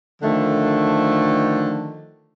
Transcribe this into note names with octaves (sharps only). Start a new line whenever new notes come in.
D3 D#3 F3 A3